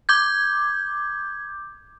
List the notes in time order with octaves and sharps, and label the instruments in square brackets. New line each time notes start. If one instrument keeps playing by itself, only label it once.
[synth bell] D6 G6 G#6